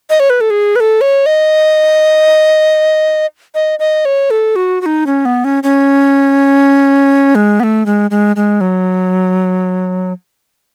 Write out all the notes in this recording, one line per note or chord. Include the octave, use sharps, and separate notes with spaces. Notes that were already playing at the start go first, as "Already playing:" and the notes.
D#5
C#5
B4
A4
G#4
B4
A4
C#5
D#5
D#5
D#5
C#5
A4
F#4
F#4
D#4
C#4
B3
C#4
C#4
G#3
B3
A3
G#3
G#3
G#3
F#3